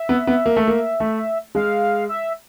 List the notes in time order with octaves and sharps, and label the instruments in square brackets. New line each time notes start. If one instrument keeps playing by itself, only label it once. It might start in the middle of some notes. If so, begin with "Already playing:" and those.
Already playing: [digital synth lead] E5
[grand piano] B3
B3
A#3
A3
A#3
A3
[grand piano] G#3 [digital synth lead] F5
[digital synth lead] E5